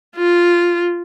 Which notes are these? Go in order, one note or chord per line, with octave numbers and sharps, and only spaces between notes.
F4